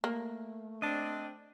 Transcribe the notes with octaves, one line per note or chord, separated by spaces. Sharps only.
A3 A#3
C4 D4 D#5 A5